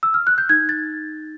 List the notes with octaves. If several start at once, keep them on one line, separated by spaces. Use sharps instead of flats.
E6
F6
F#6
G6
D#4 G#6
A6